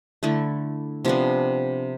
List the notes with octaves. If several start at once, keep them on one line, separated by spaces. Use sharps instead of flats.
D3 A3 E4 A4
C3 F3 B3 D4